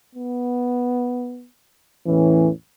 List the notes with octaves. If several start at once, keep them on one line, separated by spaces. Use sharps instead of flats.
B3
E2 A2 E3 C#4